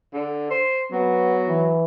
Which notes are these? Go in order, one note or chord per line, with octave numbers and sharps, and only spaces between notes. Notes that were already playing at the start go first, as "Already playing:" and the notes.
D3
C5
F#3 B3
E3